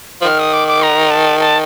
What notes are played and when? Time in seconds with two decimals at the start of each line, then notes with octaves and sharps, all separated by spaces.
0.21 F3
0.24 D#3 F6
0.39 D#6
0.53 D6
0.68 D6
0.83 A#5
1.11 A5
1.40 A5